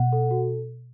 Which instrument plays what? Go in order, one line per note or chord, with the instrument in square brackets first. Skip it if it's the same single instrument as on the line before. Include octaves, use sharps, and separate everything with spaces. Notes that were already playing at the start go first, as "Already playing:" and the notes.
Already playing: [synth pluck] B2 [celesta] F#5
[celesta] A4
F#4